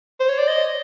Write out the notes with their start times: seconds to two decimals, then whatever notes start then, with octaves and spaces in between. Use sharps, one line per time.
0.20 C5
0.29 C#5
0.38 D5
0.48 D#5